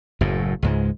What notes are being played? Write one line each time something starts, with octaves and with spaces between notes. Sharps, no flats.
F#1 F#2 A2
C#2 G#2 G#3